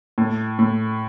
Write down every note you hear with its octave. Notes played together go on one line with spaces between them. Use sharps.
A2
A2